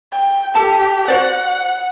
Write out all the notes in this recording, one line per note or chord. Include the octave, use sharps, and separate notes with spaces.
G5
G4 A4 A5
F#4 C5 D5 F#5